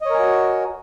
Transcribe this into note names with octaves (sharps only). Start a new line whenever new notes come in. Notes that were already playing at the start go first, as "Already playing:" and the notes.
F#4 A#4 C#5 D#5 G#5